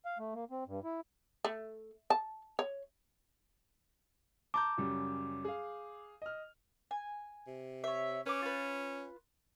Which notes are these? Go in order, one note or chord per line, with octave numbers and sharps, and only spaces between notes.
F5
A3
A#3
C4
G2
E4
A3
A5
C#5
A5 A#5 D6 G6
F#2 C#3 G3
G#4 F5
D#5 F6
G#5
C3
C#5 E5
C#4 B4 D6
F4 B4